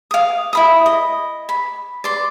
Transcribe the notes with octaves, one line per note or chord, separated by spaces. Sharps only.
F5 D#6
E4 B5 D#6
D#5
B5
D5 C6